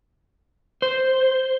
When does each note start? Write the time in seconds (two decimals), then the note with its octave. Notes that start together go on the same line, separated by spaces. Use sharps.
0.82 C5